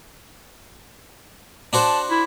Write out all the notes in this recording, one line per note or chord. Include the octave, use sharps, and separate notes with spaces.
D4 F#4 C5 A5
E4